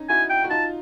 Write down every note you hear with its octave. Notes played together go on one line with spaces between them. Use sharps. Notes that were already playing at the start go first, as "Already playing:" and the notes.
Already playing: C#4 D#4
E4 F#4 G#5
G5
F#4
D#4 F4 A5